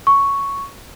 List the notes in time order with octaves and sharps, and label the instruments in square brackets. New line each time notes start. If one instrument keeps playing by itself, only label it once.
[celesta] C#6